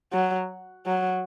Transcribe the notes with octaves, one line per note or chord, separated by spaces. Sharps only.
F#3
F#3